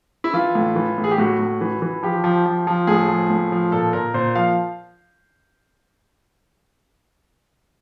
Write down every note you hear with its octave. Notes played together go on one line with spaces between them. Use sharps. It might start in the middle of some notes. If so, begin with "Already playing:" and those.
E4
E3 F4
A2
E3
A2
G#4
G4
A2 F#4
A2
E3
E3
F3 G4
F3
F3
F3
A2 G#4
F3
A2
F3
A#2 A4
A#2 A#4
A#2 C5
F3 F5